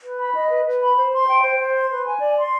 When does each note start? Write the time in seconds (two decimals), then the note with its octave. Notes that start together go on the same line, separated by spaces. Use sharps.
0.03 B4
0.18 B5
0.34 D#5
0.50 B4
0.65 B4
0.81 B5
0.97 C5
1.13 C6
1.28 G5
1.43 C5
1.59 C5
1.75 C6
1.90 B4
2.06 G#5
2.21 D5
2.37 C6